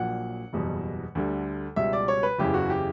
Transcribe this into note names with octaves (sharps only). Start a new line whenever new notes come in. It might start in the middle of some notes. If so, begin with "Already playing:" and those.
Already playing: A#1 A#2 F#3 F#5
F#1 E2 B2 G3
D2 D3 G3
C#2 B2 G3 E5
D5
C#5
B4
F#1 E2 C#3 E3 G4
F#4
G4